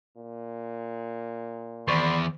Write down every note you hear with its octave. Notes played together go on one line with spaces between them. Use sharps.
A#2
E2 D#3 D5 B5 C6